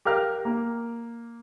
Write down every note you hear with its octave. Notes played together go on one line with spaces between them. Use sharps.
G4 A#4 F5 F6
A#3